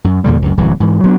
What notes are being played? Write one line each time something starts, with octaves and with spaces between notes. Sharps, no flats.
F#2
E2 A#2 D3 G3
C#2 F#2
D1 C2 F#2 E3
G#2 E3
F#3 B3 D4